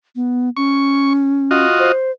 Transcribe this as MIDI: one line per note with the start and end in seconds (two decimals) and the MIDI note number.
0.16 0.49 59
0.57 1.65 61
0.57 1.13 85
1.51 1.92 65
1.51 1.92 66
1.51 1.92 75
1.79 2.11 72